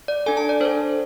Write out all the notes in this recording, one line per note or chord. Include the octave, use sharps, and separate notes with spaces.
D5
D4 A4 G#5
A5
D5
D4 A4 C5